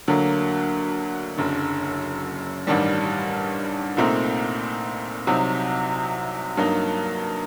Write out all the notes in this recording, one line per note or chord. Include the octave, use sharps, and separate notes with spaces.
D2 D3 F#3 A#3
F#1 F#2 D3
A1 G2 D#3 G3
C2 A#2 A3 C4 D#4
C2 C3 F#3 C4 D#4
G2 F#3 A#3 D#4